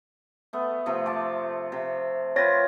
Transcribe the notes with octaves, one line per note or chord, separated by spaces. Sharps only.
A3 B3
C3 F3 A3
A5 D6
C3
C4 F4 B4 C#5 A6 A#6